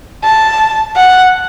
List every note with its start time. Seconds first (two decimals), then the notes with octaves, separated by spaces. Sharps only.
0.24 A5
0.96 F#5